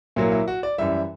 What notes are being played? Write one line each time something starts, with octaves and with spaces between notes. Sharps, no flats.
A#2 F#3 A#3 E4
E4
F#4
D5
F#2 E3 G3 E5